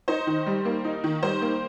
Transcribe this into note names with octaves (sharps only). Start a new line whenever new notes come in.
D#4 C5
D#3
G3
A#3
D#4
D#3
G3 C5
A#3